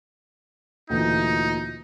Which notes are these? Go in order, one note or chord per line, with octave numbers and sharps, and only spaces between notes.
D2 A#2 E3 D#4